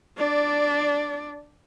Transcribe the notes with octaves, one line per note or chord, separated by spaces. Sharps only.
D4 D5